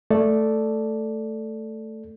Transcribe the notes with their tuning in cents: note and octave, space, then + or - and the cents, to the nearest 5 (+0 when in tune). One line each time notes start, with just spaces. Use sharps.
A3 +0 A4 +0 D5 +0